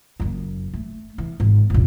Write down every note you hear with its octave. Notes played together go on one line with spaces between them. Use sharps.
F#1 F#2
A3
E3
G#1
F1 A#1